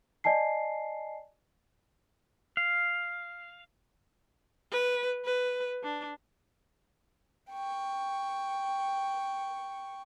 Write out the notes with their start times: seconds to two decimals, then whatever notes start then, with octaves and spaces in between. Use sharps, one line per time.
0.24 D5 D#5 G#5 A5 C7
2.57 F5
4.72 B4
5.25 B4
5.83 D4
7.51 G5 C#6